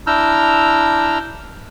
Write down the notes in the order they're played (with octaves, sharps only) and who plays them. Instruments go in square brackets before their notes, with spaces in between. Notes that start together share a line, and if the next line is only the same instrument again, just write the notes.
[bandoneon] D4 E4 A#5 E6 F6 G6